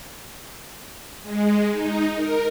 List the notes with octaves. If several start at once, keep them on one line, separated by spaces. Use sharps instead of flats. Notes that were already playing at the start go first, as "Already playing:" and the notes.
G#3
D#4
A#4